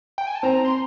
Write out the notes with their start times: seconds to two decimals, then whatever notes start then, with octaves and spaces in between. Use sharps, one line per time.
0.18 G5
0.27 G#5
0.35 A5
0.43 C4 A#5
0.65 C6